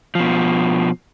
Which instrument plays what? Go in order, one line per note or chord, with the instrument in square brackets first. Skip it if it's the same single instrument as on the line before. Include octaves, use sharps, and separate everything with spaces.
[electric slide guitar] B2 F3